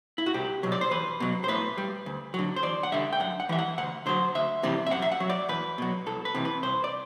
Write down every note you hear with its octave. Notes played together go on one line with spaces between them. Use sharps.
E4
F#4
C2 G4
B2 F#3
D5
C5
E2 B4
B2 F#3
C5
A2 B4
G3
D2
D3 F#3
C5
E2 D5
F#5
D3 G3 E5
G5
F#2 F#5
F#5
E3 G3 E5
F#5
D2 F#5
D3 F#3 C5
D2 E5
C3 E3 G3
E5
F#2 F#5
E5
F#5
F#3
D5
E2 B4
B2 F#3
C2 A4
B4
C3 E3
B4
C2 C5
D5